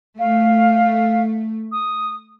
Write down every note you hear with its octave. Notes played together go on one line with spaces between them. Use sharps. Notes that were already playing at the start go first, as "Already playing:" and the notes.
A3 F5
D#6